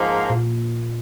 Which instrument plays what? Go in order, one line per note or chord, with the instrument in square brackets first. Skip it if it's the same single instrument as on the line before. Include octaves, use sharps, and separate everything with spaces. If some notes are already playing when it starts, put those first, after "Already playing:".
Already playing: [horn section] G#2 F3 A#3
[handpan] A#2